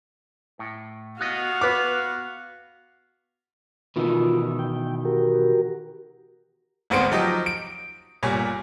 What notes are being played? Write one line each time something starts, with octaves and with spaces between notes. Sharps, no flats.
A2
B3 F#4 D#5 F5
B3 B4 D6
B2 D#3 E3 F4
G5
F#4 G4 A#4
G#1 D2 B3 C4 C6 D7
F3 F#3 D#4 G4 D#5
D7
G1 A#2 G3 C#5 G#5